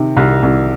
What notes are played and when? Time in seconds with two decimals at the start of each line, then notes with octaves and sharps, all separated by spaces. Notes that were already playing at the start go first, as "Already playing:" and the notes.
Already playing: C3 D#3
0.17 C2
0.43 C2